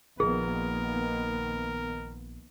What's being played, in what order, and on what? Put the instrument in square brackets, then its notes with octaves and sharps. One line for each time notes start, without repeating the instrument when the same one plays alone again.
[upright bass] A#1 [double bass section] D#3 A#3 B3 [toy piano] G#4 [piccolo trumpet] A#4